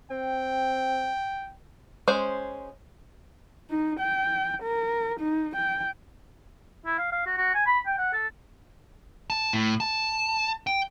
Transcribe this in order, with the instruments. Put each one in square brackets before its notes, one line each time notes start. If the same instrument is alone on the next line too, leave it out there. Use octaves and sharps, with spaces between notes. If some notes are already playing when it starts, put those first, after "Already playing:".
[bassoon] C4 [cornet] G5
[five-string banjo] G#3 C#4 C5
[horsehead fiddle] D#4
G5
A#4
D#4
G5
[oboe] E4
F5
F5
F#4
F#4
G#5
B5
G5
F#5
A4
[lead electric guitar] A5
A2
A5
G5